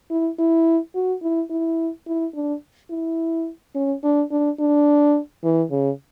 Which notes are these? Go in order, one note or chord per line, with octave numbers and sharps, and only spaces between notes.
E4
E4
F#4
E4
E4
E4
D4
E4
C#4
D4
D4
D4
E3
C#3